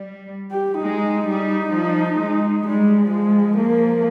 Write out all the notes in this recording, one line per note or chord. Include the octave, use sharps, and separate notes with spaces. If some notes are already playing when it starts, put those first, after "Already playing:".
Already playing: G3
G4
G#3 D#4
G3
F3
G#3
G3 G#3
F3 G#3
A#3